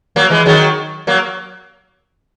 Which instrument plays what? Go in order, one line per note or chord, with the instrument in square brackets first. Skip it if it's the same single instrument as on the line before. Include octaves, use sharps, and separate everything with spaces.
[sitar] F#3 A#3
E3 G#3
D#3 F#3
F#3 A#3